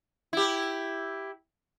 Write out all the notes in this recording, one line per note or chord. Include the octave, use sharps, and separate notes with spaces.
E4 G4